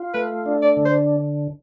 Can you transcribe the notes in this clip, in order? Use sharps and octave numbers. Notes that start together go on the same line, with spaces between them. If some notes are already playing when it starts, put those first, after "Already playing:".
Already playing: F4
A3 B4
D4
D5
D3
C5